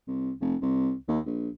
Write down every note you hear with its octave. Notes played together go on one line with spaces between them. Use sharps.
C2
F1
C2
D#2
A#1